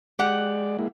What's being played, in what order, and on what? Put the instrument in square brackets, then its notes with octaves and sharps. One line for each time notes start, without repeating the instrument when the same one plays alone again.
[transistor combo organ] G#3 D5 [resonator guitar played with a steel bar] G4 F#5
[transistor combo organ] G#3 A#3 E4